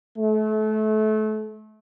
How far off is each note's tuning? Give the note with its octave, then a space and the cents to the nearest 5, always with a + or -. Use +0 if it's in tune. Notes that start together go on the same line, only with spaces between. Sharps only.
A3 -30